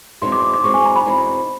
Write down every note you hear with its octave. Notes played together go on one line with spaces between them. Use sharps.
E2 B2 G#3 C4 D#4 C6
D6
D6
E2 B2 G#3 C4 D#4 C#6
G#5
A#5
B5
E2 B2 G#3 C4 D#4